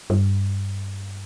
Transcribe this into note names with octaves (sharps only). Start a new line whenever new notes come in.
G2